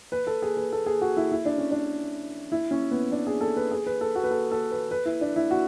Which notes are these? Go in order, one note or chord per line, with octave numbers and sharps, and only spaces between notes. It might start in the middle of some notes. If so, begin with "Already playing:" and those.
B4
A4
G#4
B4
A4
G#4
F#4
E4
E4
D4
C#4
D4
E4
C#4
B3
D4
G#4
A4
B4
G#4
B4
A4
F#4
B4
A4
A4
B4
B4
E4
D4
E4
F#4